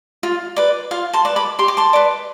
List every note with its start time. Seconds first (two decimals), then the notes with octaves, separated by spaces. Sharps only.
0.23 F4
0.56 B4 D5
0.91 F4 F5
1.13 A5 C6
1.25 B4 D5
1.36 B5 D6
1.59 G4 C6
1.68 D6
1.77 A5 C6
1.93 B4 D5